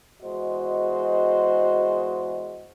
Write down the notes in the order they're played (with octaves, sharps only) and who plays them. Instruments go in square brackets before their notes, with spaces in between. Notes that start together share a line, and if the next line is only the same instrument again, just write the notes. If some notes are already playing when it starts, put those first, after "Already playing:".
[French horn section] E2 G#3 F#4 C5 D#5